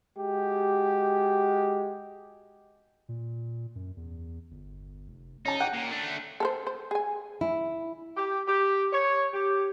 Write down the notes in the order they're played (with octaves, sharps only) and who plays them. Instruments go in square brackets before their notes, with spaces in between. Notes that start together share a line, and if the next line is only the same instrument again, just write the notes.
[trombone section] G#3 F#4 G4
[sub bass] A#2
F#2
E2
G1
F1
[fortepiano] C#4 A5 [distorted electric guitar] D#4
[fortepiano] F#5 G5
[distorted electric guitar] A#2
A3 D4
[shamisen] A4 A#4 C5
C5
G#4 G#5
[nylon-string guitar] E4
[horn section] G4
G4
C#5
G4